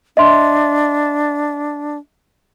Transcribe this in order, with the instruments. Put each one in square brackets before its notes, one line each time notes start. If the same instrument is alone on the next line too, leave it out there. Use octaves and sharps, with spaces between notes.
[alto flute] D4 [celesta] D#5 E5 C6